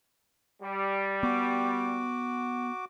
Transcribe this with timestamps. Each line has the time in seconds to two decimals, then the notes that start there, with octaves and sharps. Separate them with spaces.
0.62 G3
1.23 B3 F#4 D6